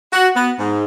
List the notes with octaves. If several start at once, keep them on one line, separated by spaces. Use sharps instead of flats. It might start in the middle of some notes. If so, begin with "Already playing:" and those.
F#4
B3
G#2